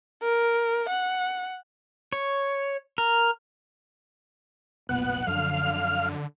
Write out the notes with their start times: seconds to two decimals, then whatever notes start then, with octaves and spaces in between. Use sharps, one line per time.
0.22 A#4
0.89 F#5
2.13 C#5
2.98 A#4
4.89 F1 B1 A#2 B3 F#5
5.27 F#2 D3 F3 F#3 F5